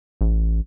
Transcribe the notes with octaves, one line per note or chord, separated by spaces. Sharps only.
A1